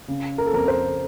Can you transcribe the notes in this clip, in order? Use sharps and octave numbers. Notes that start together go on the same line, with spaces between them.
C#3
A#4
A4
F2 A#4
C5